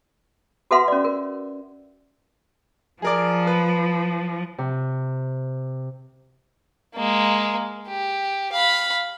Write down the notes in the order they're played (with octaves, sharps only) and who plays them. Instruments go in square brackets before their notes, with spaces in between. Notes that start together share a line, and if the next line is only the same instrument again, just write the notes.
[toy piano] F#4 A4 B4 E5 F#5 C6
C#4 D5
A#4
[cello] F3 [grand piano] G#4 A#4 D5
[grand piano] B4
[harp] C3
[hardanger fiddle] G#3 A#3
G4
F5 B5